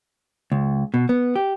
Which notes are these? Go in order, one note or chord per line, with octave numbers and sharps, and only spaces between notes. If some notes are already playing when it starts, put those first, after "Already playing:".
C#2
B2
B3
G4